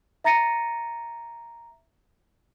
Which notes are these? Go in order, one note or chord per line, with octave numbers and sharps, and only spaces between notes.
E5 A#5 A6 A#6 C#7 D#7